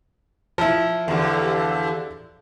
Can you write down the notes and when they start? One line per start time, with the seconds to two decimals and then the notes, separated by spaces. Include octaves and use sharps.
0.58 F3 E4
1.08 E2 D3 G4 A4 F5